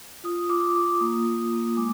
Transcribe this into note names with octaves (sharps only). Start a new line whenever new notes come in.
F4 D#6
F4 D6
F4 D6
A#3 D#6
A#3
A#3
G#3 D6